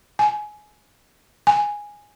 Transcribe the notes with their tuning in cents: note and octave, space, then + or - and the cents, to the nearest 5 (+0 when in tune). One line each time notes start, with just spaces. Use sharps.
G#5 +20
G#5 -5